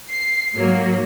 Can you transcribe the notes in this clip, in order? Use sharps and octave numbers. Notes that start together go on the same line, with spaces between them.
C7
G#2 F#3 A#3